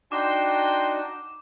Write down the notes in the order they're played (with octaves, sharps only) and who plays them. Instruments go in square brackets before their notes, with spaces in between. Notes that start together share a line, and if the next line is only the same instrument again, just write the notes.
[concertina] D4 D#4 F#4 [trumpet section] G5 C6 [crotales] D6